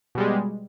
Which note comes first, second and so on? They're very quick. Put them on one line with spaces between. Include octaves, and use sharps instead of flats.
B2 G3 G#3